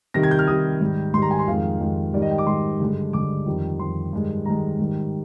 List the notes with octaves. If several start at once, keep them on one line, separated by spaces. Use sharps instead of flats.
C3 D#3 G3 A#6
G#6
G6
F6
C3 D#3 G3 D#6
G#2 D#3 G3
G#2 D#3 G3 C6
A#5
G#5
C6
F2 D#3 G#3 F5
F2 D#3 G#3
G#2 D#3 G3 D5
D#5
G5
D6
G#2 D#3 G3 C6
G2 D3 G#3
G2 D3 G#3 D6
F2 D#3 G3
F2 D#3 G3 C6
G2 D#3 G#3
G2 D#3 G#3 A#5
G#2 D#3 G3